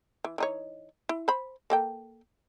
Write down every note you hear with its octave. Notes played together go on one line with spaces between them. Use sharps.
E3
E3 D#4 C#5
E4
C5 B5
A#3 A4 G5